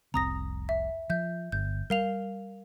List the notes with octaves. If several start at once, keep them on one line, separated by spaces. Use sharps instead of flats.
F1 C2 C4 A#5 D#6 A#6
E5
F3 E5 G6
G1 G6
G3 A#4 F5 F7